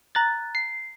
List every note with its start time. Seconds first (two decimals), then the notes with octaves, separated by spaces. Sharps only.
0.15 A#5 F#6 A6
0.55 C7